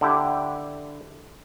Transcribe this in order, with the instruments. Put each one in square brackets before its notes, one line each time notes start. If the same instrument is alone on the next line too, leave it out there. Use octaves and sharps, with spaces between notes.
[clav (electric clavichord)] D3 E4 G4